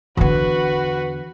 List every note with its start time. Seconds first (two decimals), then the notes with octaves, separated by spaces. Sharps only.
0.17 E2 D3 F#4 B4